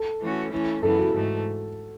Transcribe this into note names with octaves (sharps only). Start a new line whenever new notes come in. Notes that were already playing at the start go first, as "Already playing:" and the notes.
Already playing: A4
E3 A3 C#4 F#4
E3 A3 C#4 E4
F#2 C#3 E3 B3 E4 A4
F#4
G#2 E3 A3